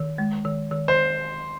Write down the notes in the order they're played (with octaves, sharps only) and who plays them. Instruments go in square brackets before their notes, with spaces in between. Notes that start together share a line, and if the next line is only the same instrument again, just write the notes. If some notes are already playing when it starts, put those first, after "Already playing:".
Already playing: [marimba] D#3
G#3
D#3
D#3
[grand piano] C5